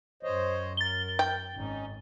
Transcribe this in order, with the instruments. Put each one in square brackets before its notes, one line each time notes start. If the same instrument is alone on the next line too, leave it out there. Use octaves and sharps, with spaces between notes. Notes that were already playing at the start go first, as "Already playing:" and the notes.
[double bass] F#2 [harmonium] C5 C#5 D#5
[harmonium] A#4 [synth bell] A6 G7
[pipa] G5
[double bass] G#1 [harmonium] C#4 D#4